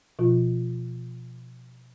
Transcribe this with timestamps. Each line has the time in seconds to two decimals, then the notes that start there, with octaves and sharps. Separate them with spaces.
0.19 B2 F3 F4